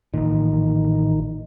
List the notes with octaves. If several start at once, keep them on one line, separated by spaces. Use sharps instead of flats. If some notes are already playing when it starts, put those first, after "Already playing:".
A1 A#2 D#3